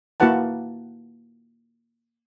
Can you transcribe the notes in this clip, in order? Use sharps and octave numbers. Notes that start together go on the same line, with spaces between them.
A#3 E4 F#4 B4 F#5 A5